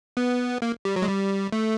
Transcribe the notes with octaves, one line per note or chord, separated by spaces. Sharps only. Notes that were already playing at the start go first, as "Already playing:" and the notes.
B3
A#3
G3
F#3
G#3
G3
A3